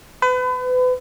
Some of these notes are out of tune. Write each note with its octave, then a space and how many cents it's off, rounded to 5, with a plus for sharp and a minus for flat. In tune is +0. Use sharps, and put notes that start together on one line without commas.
B4 +35